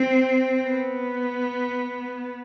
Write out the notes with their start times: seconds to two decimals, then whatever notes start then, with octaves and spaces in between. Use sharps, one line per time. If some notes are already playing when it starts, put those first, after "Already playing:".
Already playing: C4
0.67 B3